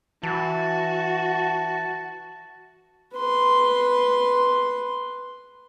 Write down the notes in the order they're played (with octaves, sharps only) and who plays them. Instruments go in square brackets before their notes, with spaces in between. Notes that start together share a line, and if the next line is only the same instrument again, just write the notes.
[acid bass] E3 [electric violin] F#4 [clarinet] A5
[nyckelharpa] B4 C6